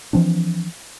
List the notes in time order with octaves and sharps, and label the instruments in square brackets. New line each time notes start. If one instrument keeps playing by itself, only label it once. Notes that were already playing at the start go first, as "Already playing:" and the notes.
[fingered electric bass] E3 F3 C4 D4